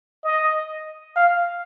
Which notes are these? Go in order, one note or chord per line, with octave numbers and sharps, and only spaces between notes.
D#5
F5